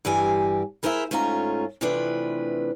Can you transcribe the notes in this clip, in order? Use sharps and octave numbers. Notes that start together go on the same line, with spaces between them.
G2 E3 G4 G#5
E4 G#4 A#4 C5 D5 E5
G#2 A3 C#4 F4 G4 A#5
C3 E3 F3 A3 D4 B4